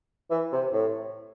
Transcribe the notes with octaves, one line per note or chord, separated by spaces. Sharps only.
E3
C3
A2